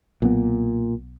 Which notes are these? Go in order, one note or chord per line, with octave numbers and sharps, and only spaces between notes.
B1 A#2 F#3 B3